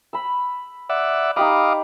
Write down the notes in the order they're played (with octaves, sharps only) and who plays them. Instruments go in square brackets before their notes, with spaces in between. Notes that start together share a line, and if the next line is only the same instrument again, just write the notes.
[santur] B5 E6
[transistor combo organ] D5 E5 F#5
[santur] D#4 G4 B5 [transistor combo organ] D#5 F5 D6